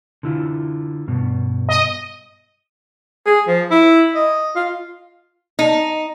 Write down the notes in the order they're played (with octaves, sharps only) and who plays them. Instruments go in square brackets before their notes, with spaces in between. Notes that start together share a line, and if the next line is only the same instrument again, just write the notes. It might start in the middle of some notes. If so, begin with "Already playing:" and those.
[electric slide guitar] D3 E4 F4
G2 B2
[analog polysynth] D#5
[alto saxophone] G#4
F3
E4
D#5
F4
[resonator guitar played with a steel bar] D#4